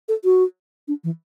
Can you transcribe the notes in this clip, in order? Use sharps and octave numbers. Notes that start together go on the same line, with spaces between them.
A4
F#4
D4
E3